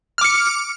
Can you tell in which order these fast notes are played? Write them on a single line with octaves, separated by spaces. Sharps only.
F6 D6 C#7